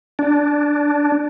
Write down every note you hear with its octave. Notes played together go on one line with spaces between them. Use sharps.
D4